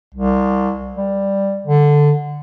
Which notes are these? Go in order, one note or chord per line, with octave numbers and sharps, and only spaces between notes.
C2
G3
D3